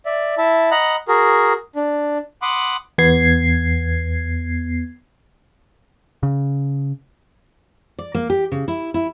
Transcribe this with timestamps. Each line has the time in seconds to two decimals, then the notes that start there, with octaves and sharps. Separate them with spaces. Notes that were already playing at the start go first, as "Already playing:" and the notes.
0.06 D5 E5
0.38 E4 E5 A5
0.71 D#5 F#5 A#5 B5
1.08 F#4 G#4 A#4
1.76 D4
2.42 F#5 B5 C6 D6 D#6
2.98 E2 B3 G#6 C7
6.23 C#3
7.99 D5
8.15 A#3
8.30 G4
8.52 C#3
8.68 E4
8.94 E4